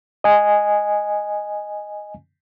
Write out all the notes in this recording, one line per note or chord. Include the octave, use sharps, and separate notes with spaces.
D#5 G#5